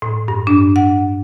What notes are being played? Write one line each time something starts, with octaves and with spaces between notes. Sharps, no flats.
A2
G2
D4
F#5